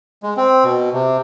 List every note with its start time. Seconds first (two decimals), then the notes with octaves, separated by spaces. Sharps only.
0.23 G#3
0.37 C4
0.64 B2
0.93 C3